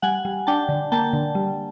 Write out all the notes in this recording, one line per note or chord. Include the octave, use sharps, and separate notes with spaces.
G3 F#5 G#5
G3
D4 G5 A5
D3
A#3 G5 A5
D3
G3